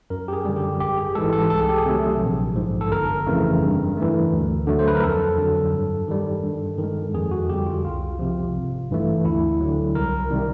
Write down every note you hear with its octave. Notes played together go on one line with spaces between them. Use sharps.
F#2 A#4
G4
G#4
D3 G3
G4
G#1 G4
G#4
G#2 E3 G#3 A4
A4
C2 A4
G#4
G4
G#4
C3 D#3 F#3 A3
A#1
G#2 F3
A4
G1 A#4
F2 C#3 E3 A3
G2
E3 A3
D2
D3 F#3 A3
C5
B4
A#4
F2 A4
D3 F#3
G2
D#3 G3
G2
D#3
G#3
F2 G#4
F#4
D3 G3 G4
F4
C2 F4
C3 F3
G#1
G2 E3 A3
D2 E4
D3 F#3
C2 A#4
C3 D#3 G3